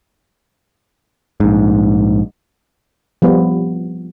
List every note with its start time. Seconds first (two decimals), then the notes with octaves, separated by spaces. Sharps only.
1.40 A#1 G#2
3.22 F3 G3 B3 F4